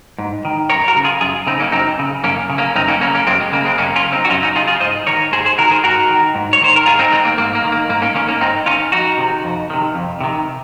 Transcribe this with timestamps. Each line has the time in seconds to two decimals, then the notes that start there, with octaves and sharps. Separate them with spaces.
0.18 G#2
0.45 D#3
0.70 F#2 A#4 C#5
0.88 F#4 A#4
0.96 C#3
1.04 F4 G#4
1.21 F#2 F4 G#4
1.47 C#3 C4 D#4
1.59 A#3 C#4
1.72 F#2 C4 D#4
1.99 C#3
2.24 F#2 A#3 C#4
2.50 C#3
2.58 A#3 C#4
2.76 F#2 C4 D#4
2.88 A#3 C#4
3.01 C#3 A#3 C#4
3.15 A#3 C#4
3.27 F#2 G#3 C4
3.40 G#3
3.52 C#3 A#3
3.65 G#3 C4
3.78 F#2 A#3 C#4
3.96 C#4 F4
4.04 C#3
4.12 C4 D#4
4.25 F#4
4.30 F#2 C#4 F4
4.43 D#4 F#4
4.55 C#3 F4 G#4
4.68 F4 G#4
4.80 G#2 C5 D#5
5.07 D#3 A#4 C#5
5.32 G#2 G#4 C5
5.45 G#4 C5
5.58 D#3 F#4 A#4
5.71 G#4 C5
5.84 G#2 F#4 A#4
6.10 D#3
6.35 G#2
6.53 C#5
6.61 D#3 C5
6.76 A#4
6.86 G#2 F4 G#4
6.99 C4 D#4
7.12 D#3 G#3 C4
7.25 A#3
7.38 G#2 A#3
7.55 A#3
7.64 D#3
7.72 A#3
7.89 G#2 A#3
8.02 A#3 C#4
8.15 D#3 A#3 C#4
8.28 A#3 C#4
8.41 G#2 C4 D#4
8.66 D#3 C#4 F4
8.92 F2 D#4 F#4
9.18 C3 D#3
9.44 F2
9.70 C3 D#3
9.95 F2
10.20 C3 D#3